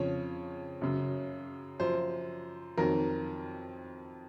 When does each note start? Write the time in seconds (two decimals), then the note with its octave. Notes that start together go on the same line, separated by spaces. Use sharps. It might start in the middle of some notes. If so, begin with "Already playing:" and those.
Already playing: F2 C#3 F3 C#5
0.81 F#2 C#3 F#3
1.79 F#2 F3 C5
2.78 F2 D#3 F#3 A#4